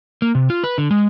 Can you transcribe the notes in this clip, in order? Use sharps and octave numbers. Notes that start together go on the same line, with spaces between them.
A#3
C3
F4
B4
D3
G#3